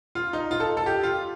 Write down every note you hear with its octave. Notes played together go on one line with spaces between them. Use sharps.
F4
D#4
F4
A4
A4
G4
F4